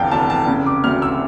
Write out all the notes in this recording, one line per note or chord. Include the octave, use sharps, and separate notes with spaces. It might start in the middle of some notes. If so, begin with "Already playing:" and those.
Already playing: F1 E2 D3 F5 G5 A5
F1 A5
A5
C#3
D6
D2 F6
E6